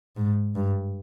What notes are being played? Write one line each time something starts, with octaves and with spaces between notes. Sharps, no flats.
G#2
G2